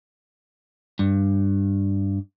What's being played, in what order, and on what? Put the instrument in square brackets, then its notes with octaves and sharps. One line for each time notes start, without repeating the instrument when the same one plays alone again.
[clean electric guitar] G2